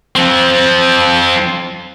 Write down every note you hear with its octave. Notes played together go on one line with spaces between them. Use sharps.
F3 C4